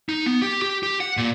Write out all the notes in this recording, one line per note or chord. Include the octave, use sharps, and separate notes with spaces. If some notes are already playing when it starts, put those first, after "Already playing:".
D#4
B3
G4
G4
G4
F#5
A#2